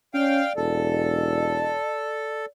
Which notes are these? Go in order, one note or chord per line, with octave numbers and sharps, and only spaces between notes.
C#4 D5 F5 G5
E1 A4